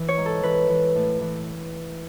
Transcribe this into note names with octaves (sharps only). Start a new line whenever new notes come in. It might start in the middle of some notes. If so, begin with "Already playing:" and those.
Already playing: E3
C#5
G#2
A4
E3 B4
E3
A2
E3